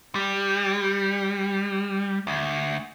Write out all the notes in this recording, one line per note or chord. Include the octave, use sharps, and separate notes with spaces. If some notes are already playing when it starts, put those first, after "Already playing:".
G3
D2